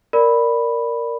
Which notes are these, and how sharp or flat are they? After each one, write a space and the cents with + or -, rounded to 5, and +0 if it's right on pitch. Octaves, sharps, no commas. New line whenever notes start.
A#4 +0 D5 +0 B5 +0